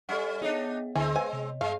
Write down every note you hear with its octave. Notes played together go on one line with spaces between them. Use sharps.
G3 C#4 A4 E5 F#5
B3 D4 D#4 G#4 C#5 D#5
D2 D3 E3 G#3 C4 G#5
B4 C5 F5 G#5
C3
G2 G#3 F5